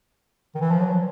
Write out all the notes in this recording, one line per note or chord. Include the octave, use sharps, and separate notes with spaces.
D#3
E3
F3
F#3
F3